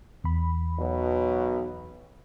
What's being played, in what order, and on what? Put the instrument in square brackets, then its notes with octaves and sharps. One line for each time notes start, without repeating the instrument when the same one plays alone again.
[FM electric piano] E2 B5
[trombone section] B1 B2 F#3